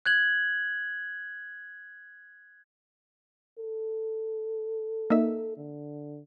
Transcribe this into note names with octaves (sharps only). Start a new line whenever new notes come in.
F#6 G#6 F#7
A4
A#3 D#4 E5
D3